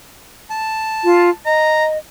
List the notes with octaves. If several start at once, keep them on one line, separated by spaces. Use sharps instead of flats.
A5
F4
D#5 A#5